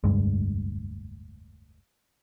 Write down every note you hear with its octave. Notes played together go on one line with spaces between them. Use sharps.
F1 D2 G2 G#3